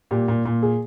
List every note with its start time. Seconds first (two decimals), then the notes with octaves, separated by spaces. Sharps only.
0.11 A#2 G4
0.28 A#2
0.45 A#2
0.63 G#4